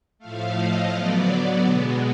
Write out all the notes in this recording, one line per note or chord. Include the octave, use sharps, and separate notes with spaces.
A2 F3 A3 F5
D#5
D3 F#3 B3 D5
D5
B2 G#3 B3